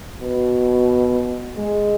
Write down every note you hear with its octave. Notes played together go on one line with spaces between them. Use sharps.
B2
G#3